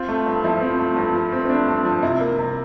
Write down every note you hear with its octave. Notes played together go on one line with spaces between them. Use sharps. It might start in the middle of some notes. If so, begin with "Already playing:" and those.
Already playing: C4 F4
A3
G2
F3 E4
C4
A3
G2
F3
C4
C4
A3 D4
G2
F3
C3 E4
A#3
C3